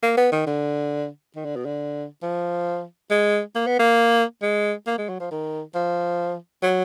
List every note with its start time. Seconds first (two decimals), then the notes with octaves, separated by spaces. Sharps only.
0.03 A#3
0.17 B3
0.32 D#3
0.47 D3
1.36 D#3
1.45 D3
1.56 B2
1.66 D3
2.23 F3
3.10 G#3
3.55 A#3
3.67 B3
3.79 A#3
4.42 G#3
4.87 A#3
4.98 G#3
5.09 F#3
5.20 F3
5.31 D#3
5.75 F3
6.63 F#3